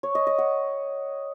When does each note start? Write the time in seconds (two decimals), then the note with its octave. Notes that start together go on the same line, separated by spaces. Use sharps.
0.03 C#5
0.15 D#5
0.27 D#5
0.38 F#5